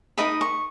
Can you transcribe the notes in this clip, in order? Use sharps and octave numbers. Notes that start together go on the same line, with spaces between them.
D#4 A#4 D#5 B5
C#6